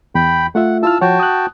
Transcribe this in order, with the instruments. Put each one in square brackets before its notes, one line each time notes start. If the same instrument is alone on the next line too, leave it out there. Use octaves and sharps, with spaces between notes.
[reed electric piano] E2 [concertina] G5 B5
[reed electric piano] A3 F4 E5 [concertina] F#5
[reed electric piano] E4 F4 F6 [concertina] A5 E6
[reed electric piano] F3 C#5 F#5 [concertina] F#4 G5 A5
[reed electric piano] D#6 F#6